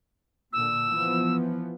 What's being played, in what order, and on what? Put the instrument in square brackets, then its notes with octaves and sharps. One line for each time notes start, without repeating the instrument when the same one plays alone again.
[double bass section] A#2 D3 [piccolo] E6
[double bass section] E3 F3 B3